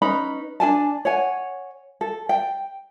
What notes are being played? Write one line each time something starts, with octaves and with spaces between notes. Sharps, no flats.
C#4 D#4 B4 B5
D4 A#4 G#5 A5
C#5 F#5 G#5
A4
G5